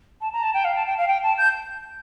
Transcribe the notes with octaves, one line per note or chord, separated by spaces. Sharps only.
A5
A#5
A5
G5
F5
A5
G5
F5
G5
A5
G6